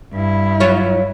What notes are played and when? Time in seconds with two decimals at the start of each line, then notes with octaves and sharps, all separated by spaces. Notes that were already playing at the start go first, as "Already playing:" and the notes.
0.13 G2 E4
0.60 F#3 F4 C#5